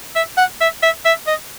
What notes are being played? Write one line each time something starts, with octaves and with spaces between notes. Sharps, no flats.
E5
F#5
E5
E5
E5
D#5